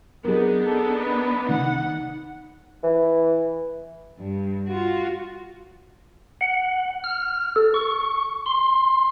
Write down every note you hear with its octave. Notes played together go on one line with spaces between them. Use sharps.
F#3 B3 C4 D4 D#4 G#4 A#4
A4
B4
C2 D#3 F#5
E3
G2
F4 F#4
F#5
F6
A4
C#6
C6